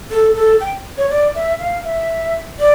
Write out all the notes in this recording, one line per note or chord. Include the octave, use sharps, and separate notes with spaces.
A4
A4
G5
C#5
D5
E5
F5
E5
D5